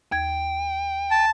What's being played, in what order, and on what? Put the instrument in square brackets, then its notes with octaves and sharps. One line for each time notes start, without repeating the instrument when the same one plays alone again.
[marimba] D#2 G#6 [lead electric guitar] G5
[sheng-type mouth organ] A5